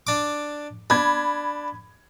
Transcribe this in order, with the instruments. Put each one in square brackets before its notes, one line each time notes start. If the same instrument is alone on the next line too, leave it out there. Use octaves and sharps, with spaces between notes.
[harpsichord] D4 D6
[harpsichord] D4 [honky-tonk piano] B5 G#6